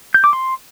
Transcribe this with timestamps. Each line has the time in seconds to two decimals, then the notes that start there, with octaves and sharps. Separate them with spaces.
0.14 G6
0.24 D6
0.33 C6